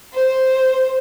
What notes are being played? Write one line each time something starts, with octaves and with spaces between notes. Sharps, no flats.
C5